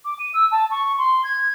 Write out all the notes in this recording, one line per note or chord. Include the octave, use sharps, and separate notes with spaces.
D6
D#7
E6
A5
C#6
C6
G#6